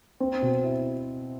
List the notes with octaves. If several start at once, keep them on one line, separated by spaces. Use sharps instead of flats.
C4
B2
E4